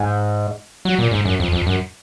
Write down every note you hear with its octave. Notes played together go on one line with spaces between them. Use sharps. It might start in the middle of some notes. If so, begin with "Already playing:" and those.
Already playing: G#2
F#3
A#2
G#2
F#2
F2
F2
F#2